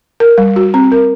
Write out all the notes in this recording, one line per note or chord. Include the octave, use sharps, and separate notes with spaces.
A#4
G3
F#4
C4
A#4